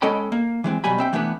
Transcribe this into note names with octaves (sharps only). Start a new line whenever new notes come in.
G#3 C#4 A4 D#5 G5 B5
A#3
E3 G#3 C4
B2 F#3 G3 G#5 B5
C4 E5 G5
E3 A3 B3 D4 B4